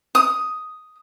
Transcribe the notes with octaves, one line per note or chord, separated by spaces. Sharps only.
D#6